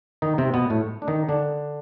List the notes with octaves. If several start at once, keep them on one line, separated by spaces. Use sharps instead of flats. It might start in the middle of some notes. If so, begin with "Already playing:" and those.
D#3 D#4
C3 C4
B2 B3
A2 A3
D4
D#3 D#4
D3 D4